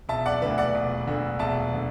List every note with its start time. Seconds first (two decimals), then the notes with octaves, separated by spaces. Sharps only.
0.09 E1 E5 A5
0.26 D5 F#5
0.42 D2 D3 B4 E5
0.58 D5 F#5
0.75 E1
1.07 D2 D3
1.39 E1 E5 A5
1.74 D3